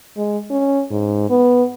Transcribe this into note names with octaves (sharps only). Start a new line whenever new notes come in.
G#3
C#4
G#2
B3